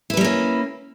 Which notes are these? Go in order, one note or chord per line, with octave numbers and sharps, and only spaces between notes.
G3 A#3 C#4 E4 B4